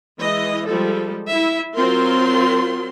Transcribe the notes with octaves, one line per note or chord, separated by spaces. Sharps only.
E3 G#3 D#5
F3 G3 G#3 A4
E4 E5
F#3 C4 F4 A#4 C6